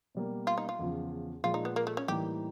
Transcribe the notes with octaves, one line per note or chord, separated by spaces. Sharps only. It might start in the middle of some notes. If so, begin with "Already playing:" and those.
B2 G3 A#3
F4
D#4
F4
E2 C#3 F3
A#2 F3 G#3 F4
D#4
B3
A#3
A3
C#4
A2 E3 G3 A#3 D#4 G4